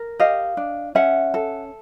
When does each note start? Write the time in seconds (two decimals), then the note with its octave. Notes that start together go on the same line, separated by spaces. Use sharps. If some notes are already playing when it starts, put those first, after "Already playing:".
Already playing: A#4
0.19 G4 D#5 F5
0.57 D4
0.95 C#4 E5 F#5
1.34 A4